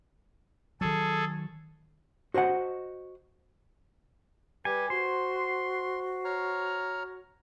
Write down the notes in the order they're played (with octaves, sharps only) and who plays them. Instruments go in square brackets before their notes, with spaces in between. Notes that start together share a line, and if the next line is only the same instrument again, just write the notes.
[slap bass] D#3 F#3 [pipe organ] G#4 A4
[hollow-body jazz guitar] F#4 C5 D#5 F#5
[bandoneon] G3 G4 [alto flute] B4 [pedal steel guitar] G#5
[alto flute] F#4 [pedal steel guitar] C5 [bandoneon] C6
[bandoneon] C#5 A#5 F6